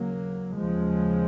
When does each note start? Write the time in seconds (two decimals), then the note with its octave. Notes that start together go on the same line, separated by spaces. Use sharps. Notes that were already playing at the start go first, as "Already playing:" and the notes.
Already playing: D#2 C#3 F#3 A#3
0.56 D#2 C#3 F3 G#3